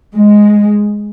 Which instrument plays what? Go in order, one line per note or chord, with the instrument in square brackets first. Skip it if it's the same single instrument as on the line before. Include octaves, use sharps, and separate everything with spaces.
[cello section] G#3